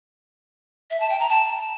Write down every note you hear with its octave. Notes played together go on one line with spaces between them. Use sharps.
E5
A5
G5
A#5
A5